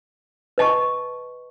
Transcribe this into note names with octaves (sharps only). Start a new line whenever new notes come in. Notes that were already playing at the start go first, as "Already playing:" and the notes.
B4 D#5 A5 C#6